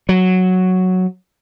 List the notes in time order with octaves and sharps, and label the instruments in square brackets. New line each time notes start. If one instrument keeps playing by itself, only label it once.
[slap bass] F#3